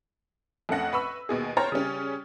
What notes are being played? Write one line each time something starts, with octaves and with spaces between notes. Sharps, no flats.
F2 A3 C#4 F#5 A#6
B4 B5 C#6 E6
D#2 B2 G#4
C5 C#5 G5 A#5 F6 A6
C#3 G3 C#4